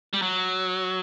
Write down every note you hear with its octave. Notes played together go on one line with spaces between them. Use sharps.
G3
F#3